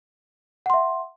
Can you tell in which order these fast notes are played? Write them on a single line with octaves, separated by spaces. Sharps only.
F#5 C6 E5